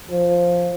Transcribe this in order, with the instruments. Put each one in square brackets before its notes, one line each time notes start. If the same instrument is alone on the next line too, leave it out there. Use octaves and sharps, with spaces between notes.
[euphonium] F3